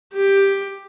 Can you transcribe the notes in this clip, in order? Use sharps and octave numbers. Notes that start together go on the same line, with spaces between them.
G4